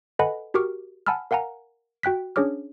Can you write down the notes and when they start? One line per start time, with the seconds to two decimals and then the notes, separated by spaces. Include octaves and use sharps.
0.19 A4 B4 D#5 F#5 G#5 B5
0.54 F#4 G4 A#4 C#6 D6 F6
1.06 F#5 G#5 A5 B5 E6 F6
1.31 A#4 F5 F#5 G#5 A#5
2.03 F#4 G5 F#6 B6
2.36 C#4 D4 G#4 C#5 D6 F6